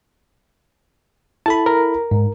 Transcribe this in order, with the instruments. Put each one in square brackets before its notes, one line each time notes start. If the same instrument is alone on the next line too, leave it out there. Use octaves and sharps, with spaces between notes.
[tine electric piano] E4 A4 B5 [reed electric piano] A5
[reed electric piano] A#4
[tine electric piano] G#2